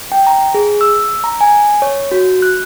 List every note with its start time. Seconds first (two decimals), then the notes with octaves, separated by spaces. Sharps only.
0.12 G5
0.27 A#5
0.54 G#4
0.81 E6
1.24 A#5
1.41 G#5
1.82 C#5
2.12 F#4
2.42 F#6